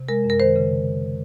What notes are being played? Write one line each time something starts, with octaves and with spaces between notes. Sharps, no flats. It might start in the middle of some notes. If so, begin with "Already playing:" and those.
Already playing: C3
G#3 A#4
F#2
A#4
D#3 C5
C#3